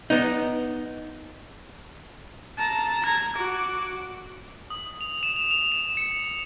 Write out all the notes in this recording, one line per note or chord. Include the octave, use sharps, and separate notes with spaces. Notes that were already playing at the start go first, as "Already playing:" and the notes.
B3 D#4
A5 A#5
A#5 G#6
F#4 D6
D#6
F7
E7
F7
F7
E7
C#7